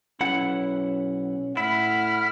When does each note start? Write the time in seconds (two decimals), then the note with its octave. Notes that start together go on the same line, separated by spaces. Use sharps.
0.21 B1 C#4 E4 F#5
1.57 A2 E4 F#5 B5 F6